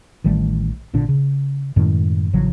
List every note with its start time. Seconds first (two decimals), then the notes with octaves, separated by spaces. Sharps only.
0.24 A1 D#3 G3 A3
0.93 G#1 A#2 D3 D4
1.09 C#3
1.76 F#2 A2 D#3 G#3
2.33 A1 C#3 F3 F#3